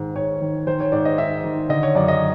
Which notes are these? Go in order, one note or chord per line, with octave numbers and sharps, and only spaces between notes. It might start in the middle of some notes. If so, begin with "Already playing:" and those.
Already playing: G#2 D#3
G#2 C#5
D#3
D#3 C5
C#5
G#2 D5
D#5
G#2 E5
D#3
D3 D#5
C#5
F#2 D5
D#5